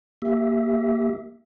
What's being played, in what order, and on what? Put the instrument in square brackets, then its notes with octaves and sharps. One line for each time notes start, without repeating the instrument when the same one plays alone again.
[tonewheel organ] A#3 G4 E5